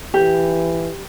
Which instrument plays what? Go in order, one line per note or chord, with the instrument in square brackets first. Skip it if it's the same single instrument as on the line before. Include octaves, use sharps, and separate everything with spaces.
[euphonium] E3 [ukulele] G4